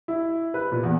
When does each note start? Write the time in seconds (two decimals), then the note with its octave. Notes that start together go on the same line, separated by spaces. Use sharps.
0.08 E4
0.54 B4
0.72 A#2
0.83 E2